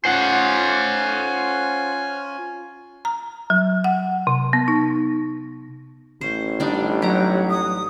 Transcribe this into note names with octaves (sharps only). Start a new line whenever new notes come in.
C#4 F4 C5 F#5 G#5
A#5
F#3
F#5
C3
B3
D#4
A1 C#4 C5
G3 D4 D#4
F#3 G4 A#5
D#6